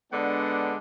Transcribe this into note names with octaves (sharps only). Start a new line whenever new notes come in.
D3 G#3 B3 D4 F#5